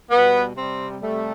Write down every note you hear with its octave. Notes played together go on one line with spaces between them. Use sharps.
B2 G3 B3
C3 G3 C4
C3 G3 A3